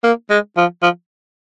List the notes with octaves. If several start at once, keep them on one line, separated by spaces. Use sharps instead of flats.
A#3
G#3
F3
F3